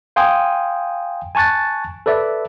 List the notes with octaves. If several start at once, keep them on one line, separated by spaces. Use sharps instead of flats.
F5 G5 G#5 C6 D#6
G#5 A5 C#6 F#6 A6
A4 B4 D5 E5